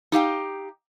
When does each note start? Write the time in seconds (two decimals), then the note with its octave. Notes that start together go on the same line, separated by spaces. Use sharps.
0.12 D#4 G4 F5 G5